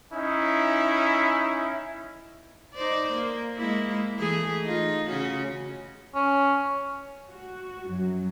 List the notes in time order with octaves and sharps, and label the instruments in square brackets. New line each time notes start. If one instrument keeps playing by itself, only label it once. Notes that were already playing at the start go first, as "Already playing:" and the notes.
[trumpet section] C#4 D#4 E4
[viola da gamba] D#4 C5 D5
A#3
G#3 A#3 E4
E3 A3 G#4
D#4 F4
C#3 C#4 F#4
[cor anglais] C#4
[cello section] F#4
F#2 F#3